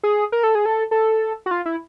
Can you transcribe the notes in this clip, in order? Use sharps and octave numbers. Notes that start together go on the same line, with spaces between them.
G#4
A#4
A4
G#4
A4
A4
F#4
F4
E4